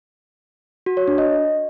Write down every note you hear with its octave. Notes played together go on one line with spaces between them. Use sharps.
F#4
C#5
D4
D#5